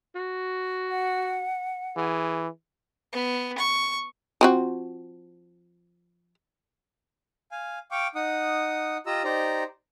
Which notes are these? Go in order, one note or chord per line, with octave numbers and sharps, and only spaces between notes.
F#4
F#5
E3 G#4
B3
C#6
F3 C4 F#4
F5 G#5
F5 G5 C#6 D6
D#4 F#5 D#6
F4 G4 D#5 A#5 E6
D#4 G4 C5 D5 A#5